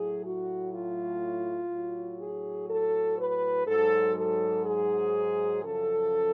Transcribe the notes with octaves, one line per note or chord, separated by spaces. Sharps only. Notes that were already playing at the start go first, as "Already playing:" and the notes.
Already playing: A2 F#3 G#4
F#4
F4
A2 F#3
G#4
A4
B4
G#2 F#3 A4
A4
G#4
F#2 C#3 F3 A4